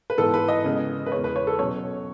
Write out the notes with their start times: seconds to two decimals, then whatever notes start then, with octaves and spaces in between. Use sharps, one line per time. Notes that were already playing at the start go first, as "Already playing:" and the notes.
0.10 B4
0.17 G#2 E3 B3 A4
0.34 B4
0.48 D#5
0.64 C#3 G#3 B3
1.06 B4
1.12 E2 C#3 G#3 C#5
1.24 B4
1.36 C#5
1.47 A4
1.58 B2 F#3 C#4 C#5